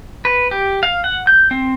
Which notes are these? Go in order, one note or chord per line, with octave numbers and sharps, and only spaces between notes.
B4
G4
F5
F#5
G6
C4